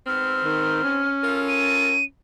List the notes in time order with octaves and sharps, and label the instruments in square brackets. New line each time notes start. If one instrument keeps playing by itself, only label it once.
[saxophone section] G#2 B3 C4 [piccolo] F6
[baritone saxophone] D#3
C#4
[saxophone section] F4 A4 A#4
[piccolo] D#7